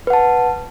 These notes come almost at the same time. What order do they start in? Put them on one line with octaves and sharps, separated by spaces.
B4 F#5 A5